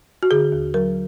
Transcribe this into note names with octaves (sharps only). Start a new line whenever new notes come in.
F#4
D3 G#4
D#2
F#3 A#4